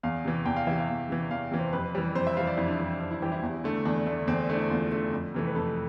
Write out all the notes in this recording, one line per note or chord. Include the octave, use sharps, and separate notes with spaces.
E2 F5
C3 E3
E2 G5
F5
C3 E3 E5
F5
E2 F5
C3 E3
E2 F5
C3 E3
C5
F2 B4
E3 G3
F2 C5
E5
E3 G3 F5
D5
F2 E4
D4
E4
E3 G3
F2 D4
E4
E3 G3 G4
E4
E2
D3 A3
E2 D4
D3 A3
E2 C4
D3 A3
E4
E2 F4
D3 A3
F2
C3 E3 A3
B4
F2 A4